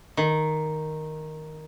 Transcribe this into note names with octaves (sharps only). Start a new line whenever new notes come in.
D#3